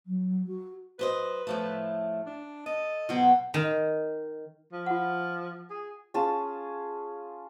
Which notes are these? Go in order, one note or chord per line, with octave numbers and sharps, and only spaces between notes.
F#3
F#4
F#2 B4 C5 D#5
A2 F3 A3
D4
A4 D#5
B2 F#3 C5
D#3
F3
F4 F#5
G#4
C#4 F4 G#4 A5